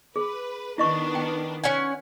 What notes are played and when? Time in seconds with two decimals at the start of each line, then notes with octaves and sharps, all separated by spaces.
0.16 G#4 B4
0.78 D#3 B3 D4 E4 D#5 C#6
1.15 G5
1.64 C#4 F#5 G#5